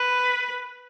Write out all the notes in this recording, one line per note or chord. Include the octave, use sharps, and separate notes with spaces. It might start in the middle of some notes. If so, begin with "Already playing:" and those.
Already playing: B4